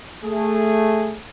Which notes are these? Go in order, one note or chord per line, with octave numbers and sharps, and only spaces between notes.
A3 G#4